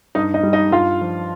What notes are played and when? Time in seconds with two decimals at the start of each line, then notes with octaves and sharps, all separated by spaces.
0.15 G2 D#4 D#5
0.34 D#4 D#5
0.43 G3
0.53 D#4 D#5
0.72 G2 F4 F5
1.01 F3